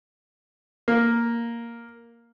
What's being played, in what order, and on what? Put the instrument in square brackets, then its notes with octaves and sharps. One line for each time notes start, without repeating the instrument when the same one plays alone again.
[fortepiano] A#3